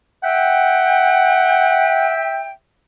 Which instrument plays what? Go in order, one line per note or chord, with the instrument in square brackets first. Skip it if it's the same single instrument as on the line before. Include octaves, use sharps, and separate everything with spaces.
[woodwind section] E5 G5 [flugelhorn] F#5